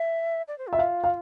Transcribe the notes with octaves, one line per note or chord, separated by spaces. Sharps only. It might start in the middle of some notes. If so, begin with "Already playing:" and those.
Already playing: E5
D5
C5
F4 E5
F5
F5